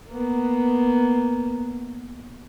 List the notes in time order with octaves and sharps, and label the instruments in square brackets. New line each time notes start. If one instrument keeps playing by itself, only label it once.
[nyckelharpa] A#3 B3